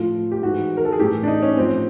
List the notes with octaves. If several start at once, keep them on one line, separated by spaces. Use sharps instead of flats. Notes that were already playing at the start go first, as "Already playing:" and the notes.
Already playing: A2 F3 F4
G4
G#2 E3 F#4
A#4
A4
G#4
A2 E3 G4
D4
D#4
C#4
A2 F3 C4